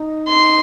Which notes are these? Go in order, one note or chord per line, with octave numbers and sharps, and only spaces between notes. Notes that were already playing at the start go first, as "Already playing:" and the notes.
Already playing: D#4
C6